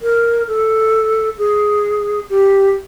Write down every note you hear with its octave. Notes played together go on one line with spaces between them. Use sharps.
A#4
A4
G#4
G4